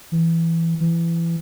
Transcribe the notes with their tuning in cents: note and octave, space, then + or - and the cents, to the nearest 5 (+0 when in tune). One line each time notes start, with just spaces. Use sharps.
E3 +5
E3 +25